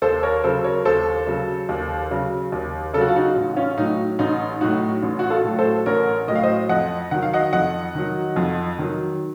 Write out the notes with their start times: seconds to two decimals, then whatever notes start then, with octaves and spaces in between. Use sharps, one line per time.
0.02 D#2 A4 C5
0.23 A#4 C#5
0.44 C#3 F#3 A4 C5
0.64 A#4 C#5
0.85 D#2 A4 C5
1.27 C#3 F#3
1.69 D#2
2.11 C#3 F#3
2.52 D#2
2.94 C#3 A4
2.97 F#3 F#4
3.08 F4
3.16 D#4 F#4
3.36 A1
3.57 C#4 F4
3.78 A2 F#3 D#4
4.19 A1 D#4
4.61 A2 F#3 D#4 F#4
5.03 A1
5.19 F#4
5.30 F4 A4
5.44 A2 F#3
5.59 A4 C5
5.86 A1 A#4 C#5
6.28 A2 F#3 D#5
6.35 F5
6.43 C5 D#5
6.69 F2 D#5 F#5
7.11 D#3 F#3 F#5
7.22 F5
7.34 D#5 F#5
7.53 F2 D#5 F#5
7.95 D#3 F#3
8.36 F2
8.79 D#3 F#3